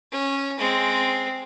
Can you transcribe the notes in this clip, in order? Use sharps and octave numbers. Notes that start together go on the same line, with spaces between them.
C#4
G#3 C4